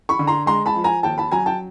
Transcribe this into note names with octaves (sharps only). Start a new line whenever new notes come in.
B5 C#6
D3
A#5 C6
G#3 A#5 C6
A5 B5
F3
G#5 A#5
D#2 G5 A5
A5 B5
F#3 G#5 A#5
G5 A5